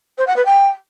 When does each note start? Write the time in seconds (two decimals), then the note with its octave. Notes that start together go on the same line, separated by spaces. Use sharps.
0.18 C5
0.27 F#5
0.36 B4
0.45 G5